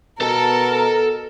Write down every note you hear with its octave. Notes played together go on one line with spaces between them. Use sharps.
B2 A4 A#4 A5